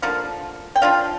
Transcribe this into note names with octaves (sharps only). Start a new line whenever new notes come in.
D3 F3 A#3 F5
G5
F3 D4 F4 F5